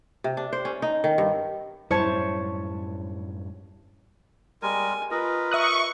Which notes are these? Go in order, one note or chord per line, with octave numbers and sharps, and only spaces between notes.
C3
D4
C5
C#4
D#4
D#3
G2
F#2 A2 G3 E4 C5 C#5 A5 C#6
G3 G#3 A#4 G#5
F4 A#4 B4 D#5
E5 C#6 D#6 F#6